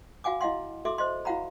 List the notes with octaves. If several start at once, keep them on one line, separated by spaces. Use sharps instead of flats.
F#4 F5 F#5 G#5 D6
E4 D#5 F5 F#5 C6
F#4 A4 E5 C6 D6
C5 D#5 C6
E4 F#4 F5 F#5 A#5 B5